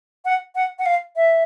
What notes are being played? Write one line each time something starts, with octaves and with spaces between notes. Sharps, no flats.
F#5
F#5
F#5
F5
E5